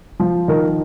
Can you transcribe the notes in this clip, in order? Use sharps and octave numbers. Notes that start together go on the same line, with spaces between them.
F3
D#3 A#4